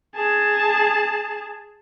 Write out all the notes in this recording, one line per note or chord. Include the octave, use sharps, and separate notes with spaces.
G#4 A5